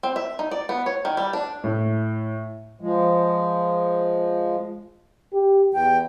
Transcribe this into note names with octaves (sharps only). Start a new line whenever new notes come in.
C4
E5
D#4
D5
B3
C#5
D#3
G3
D4
A2
F3 G#3
G4
E2 G5